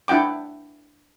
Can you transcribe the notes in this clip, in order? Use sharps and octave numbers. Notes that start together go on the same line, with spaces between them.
D4 E4 F#5 G5 D6